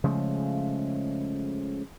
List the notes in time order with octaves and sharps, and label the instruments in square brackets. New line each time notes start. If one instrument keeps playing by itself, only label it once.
[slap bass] C#3 F3 G#3 A3